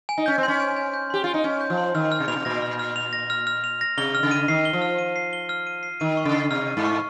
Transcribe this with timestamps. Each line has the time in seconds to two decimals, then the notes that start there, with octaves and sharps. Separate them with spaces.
0.09 G#5
0.18 D#4
0.26 C#4 G6
0.38 C4
0.43 C#4 C6
0.60 G#5
0.76 G#5
0.94 G6
1.10 G4 C6
1.24 F4 G#5
1.34 D#4
1.44 C#4 G#5
1.61 G6
1.70 F3
1.78 C6
1.95 D#3 F6
2.12 F6
2.20 C3
2.28 A#2 F7
2.36 C3
2.45 A#2 A#6
2.62 F6
2.79 F6
2.96 F7
3.13 A#6
3.30 F6
3.47 F6
3.64 F7
3.81 A#6
3.97 C3 G7
4.15 F6
4.23 C#3
4.31 D#7
4.48 D#3 C7
4.65 G7
4.73 F3
4.82 F6
4.98 D#7
5.16 C7
5.33 G7
5.49 F6
5.67 D#7
5.83 C7
6.00 D#3 D#7
6.17 C#6
6.25 C#3
6.34 C7
6.51 C3 F6
6.68 D#7
6.77 G#2
6.85 C#6